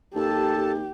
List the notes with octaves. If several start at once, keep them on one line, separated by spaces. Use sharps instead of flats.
D#2 G4 A4 A5